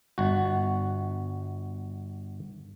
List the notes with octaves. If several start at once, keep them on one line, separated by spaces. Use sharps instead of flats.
G1 F#4